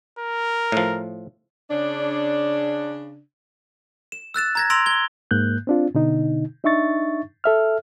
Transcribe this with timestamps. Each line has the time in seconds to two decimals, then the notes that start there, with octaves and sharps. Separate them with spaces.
0.19 A#4
0.72 A2 F3
1.71 C#3 D4
4.12 E7
4.34 E6 F#6 A6 E7
4.55 A#5 G#6 A#6
4.70 C6 E6 G#6 A#6 D7 F7
4.86 G#6 G7
5.31 G#2 A#3 F#6 G6
5.67 C4 D4 F4
5.95 B2 D3 D#4
6.64 D4 D#4 E5 C#6 A6
7.44 A4 E5 F6